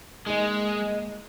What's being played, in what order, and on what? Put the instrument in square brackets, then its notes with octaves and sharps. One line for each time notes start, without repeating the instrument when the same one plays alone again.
[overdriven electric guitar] G#3 [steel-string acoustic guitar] A#3 D#4 G#4 D#5